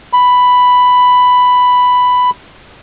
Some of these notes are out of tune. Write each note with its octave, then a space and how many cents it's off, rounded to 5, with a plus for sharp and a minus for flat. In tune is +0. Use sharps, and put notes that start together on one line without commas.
B5 +5